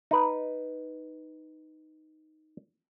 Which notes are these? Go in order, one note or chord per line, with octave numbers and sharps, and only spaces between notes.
D#4 B4